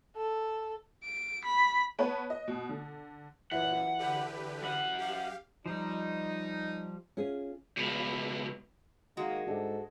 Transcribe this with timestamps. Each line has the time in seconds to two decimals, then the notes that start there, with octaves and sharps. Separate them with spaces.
0.16 A4
1.04 D7
1.45 B5
1.99 B3 B4 C#5 A5
2.30 D#5
2.48 B2
2.69 D3
3.52 F#2 A#2 E3 F#5
3.99 D3 G4 B4
4.62 F#2 F#5
4.98 G4 F5
5.66 F3 G3 D#4
7.17 C#4 F4 G#4
7.77 C#2 B2
9.17 D#3 G#3 A#3 F#4
9.47 G#2 D4 G4 A4